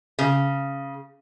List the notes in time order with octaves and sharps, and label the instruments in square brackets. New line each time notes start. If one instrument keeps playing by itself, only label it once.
[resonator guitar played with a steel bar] C#3